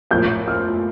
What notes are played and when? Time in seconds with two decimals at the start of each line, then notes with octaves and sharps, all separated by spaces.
0.11 A2 F3 A#3 G6
0.48 F6